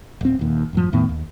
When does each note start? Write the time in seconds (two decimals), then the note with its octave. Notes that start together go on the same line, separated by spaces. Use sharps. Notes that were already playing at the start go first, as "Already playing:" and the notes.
0.21 D1 C4
0.39 D#1 D#2
0.73 A1 F#2 F3
0.92 E2 A2 D#3 B3
1.09 D#2